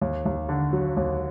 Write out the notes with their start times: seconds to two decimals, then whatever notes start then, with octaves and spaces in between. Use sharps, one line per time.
0.01 D#2
0.26 D#2
0.49 D3
0.73 F#3
0.97 D#2